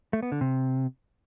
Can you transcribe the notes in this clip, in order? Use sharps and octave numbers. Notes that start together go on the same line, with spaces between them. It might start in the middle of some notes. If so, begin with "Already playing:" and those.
A3
B3
D3
C3